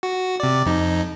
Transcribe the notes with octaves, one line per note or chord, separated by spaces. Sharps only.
F#4
C3 D5
F2 D#4